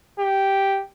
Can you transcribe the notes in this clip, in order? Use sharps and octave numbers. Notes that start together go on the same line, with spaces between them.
G4